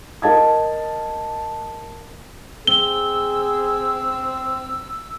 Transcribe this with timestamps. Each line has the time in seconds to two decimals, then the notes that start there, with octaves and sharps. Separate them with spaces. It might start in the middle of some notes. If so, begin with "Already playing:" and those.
0.22 A#4 D#5 A5 G#6
2.67 C4 G#4 E6 G7